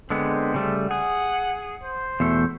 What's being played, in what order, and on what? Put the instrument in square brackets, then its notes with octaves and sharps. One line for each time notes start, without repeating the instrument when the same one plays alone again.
[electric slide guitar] D3 G#3 B3 [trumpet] C4
[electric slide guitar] C#3 G3 A3
[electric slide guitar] G#4 [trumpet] F#5
[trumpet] C5
[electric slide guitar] E2 B2 A3